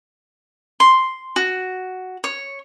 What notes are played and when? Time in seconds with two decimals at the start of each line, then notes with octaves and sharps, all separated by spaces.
0.80 C6
1.36 F#4
2.24 C#5